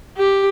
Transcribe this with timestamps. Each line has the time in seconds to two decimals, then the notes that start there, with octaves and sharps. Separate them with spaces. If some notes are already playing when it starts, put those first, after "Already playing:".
0.17 G4